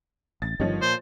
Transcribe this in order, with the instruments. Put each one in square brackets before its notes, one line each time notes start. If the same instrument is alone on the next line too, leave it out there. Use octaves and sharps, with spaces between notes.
[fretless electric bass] A1 [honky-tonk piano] A6
[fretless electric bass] G1 G2 D#3 [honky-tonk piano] F3 C#5 D#5
[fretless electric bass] A#2 [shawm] C5